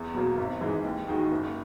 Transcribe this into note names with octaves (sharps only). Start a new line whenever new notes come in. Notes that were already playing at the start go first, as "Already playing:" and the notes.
Already playing: E2
B2 F#3 A#3
G#1
G#2 E3 G#3
D#2
D#3 G#3 D#4 F#4
F#1